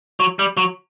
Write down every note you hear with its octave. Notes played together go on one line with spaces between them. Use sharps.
F#3
G3
F#3